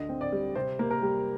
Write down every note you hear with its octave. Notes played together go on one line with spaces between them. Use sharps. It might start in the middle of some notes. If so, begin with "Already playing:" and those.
Already playing: D2 D3 D#5
C4
D5
G3
C3 C5
A#3
A#4
G3